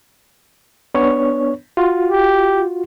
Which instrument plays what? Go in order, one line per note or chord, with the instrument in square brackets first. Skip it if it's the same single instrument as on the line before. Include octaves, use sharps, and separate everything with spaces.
[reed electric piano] B3 D4 C#5
F4 F#4
[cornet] G4